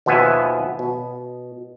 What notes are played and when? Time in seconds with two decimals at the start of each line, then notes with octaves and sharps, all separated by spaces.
0.06 D#2 B2 F3 B3 E5 G#5
0.79 B2